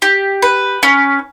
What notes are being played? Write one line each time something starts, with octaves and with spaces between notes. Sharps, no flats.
G4
B4
C#4